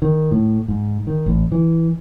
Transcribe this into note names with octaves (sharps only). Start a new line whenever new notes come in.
D#3
A2
G#2
D#3
A1
E3